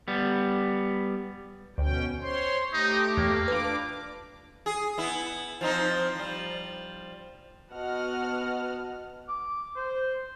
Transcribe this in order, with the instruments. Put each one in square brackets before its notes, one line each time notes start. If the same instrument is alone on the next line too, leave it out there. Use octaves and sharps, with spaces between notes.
[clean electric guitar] G3 B3
[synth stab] D2 [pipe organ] B2 C#4 G5
[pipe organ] C5 C#5 C6
[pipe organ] A3 G4 [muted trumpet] D#4
[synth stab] E2 [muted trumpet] A#3
[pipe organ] D4 D6 [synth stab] F4 B4
[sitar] G#4
B3 E4
F3 C4 D#4
F3 G3
[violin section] B3 F#4 D#5 F#5 A5 F6
[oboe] D6
C5